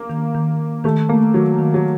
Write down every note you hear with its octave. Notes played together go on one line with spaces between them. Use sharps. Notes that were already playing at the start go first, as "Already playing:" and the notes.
Already playing: A#3
D#3
D#3
D#3
D#3 A3
A3 A#3
D#3 F#3
D#3
F#3